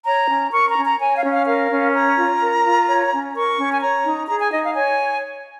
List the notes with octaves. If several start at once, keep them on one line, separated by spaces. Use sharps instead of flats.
C#5 A#5
C#4
A#4 C#6
A#5
C#4
A#5
C#5 G#5
F5
C#4
F5
A#4 F5
C#4
C#5 A#5
F4
A#4
F4
C#5
C#4
A#4 C#6
C#4
G#5
C#5 A#5
D#4
G#4 A#5
G#5
D#4 D#5
F5
C#5 G#5